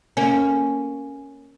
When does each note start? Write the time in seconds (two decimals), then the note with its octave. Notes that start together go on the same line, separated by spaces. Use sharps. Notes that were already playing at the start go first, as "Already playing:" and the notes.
0.17 A#3 C#4